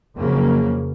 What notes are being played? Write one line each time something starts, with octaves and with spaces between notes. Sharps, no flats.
F2 C#3 F#3 A#3